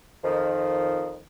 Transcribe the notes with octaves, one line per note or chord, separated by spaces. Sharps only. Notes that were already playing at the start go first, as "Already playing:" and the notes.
F2 D#3 F3